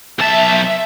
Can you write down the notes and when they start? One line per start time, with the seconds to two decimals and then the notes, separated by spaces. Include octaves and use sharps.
0.19 B1 E5 A5